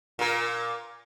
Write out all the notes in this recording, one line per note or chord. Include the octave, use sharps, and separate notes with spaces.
A#2 A#4